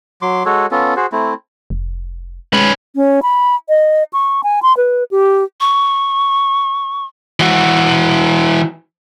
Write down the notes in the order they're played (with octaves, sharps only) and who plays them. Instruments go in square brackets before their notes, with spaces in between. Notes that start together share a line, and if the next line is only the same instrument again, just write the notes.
[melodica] F#3 C6 D6
G#3 F#4 A4 C#5
B3 C#4 F4 A4
F#4 G#4 C5
A3 C4 E4
[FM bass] F1
[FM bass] G#3 [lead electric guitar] C#4 B4
[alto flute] C#4
B5
D#5
C#6
G#5
C6
B4
G4
[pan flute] C#6
[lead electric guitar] E3 F#4